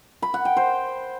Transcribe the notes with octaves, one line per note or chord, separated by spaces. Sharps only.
B5
F#5
G5
C5